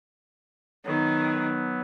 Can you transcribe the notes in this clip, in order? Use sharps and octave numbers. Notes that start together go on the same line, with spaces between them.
D#3 F#3 B3